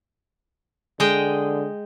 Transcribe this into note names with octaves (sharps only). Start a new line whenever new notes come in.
D3 G#3 D#5 G5